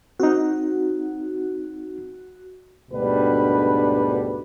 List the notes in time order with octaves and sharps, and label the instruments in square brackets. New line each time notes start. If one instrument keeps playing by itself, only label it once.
[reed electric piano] C4 D#4 [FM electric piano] F#4
[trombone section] D2 G#2 B2 G3 D4 B4